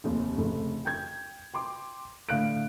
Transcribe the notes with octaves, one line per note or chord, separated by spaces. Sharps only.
F1 D#2
F1 C#3 A3
G5 G6 G#6
G5 C6 D6
A2 D3 F5 F#6 D7